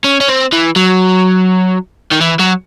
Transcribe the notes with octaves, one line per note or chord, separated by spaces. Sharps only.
C#4
C#4
C4
E3
F#3
D#3
E3
F#3